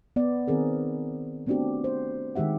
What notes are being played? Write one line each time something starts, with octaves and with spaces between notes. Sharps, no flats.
B3 D5
D#3 C4 G#4 A#4
A3 B3 C4 D4 F#4 G4
C5
D#3 G#3 G4 E5 F#5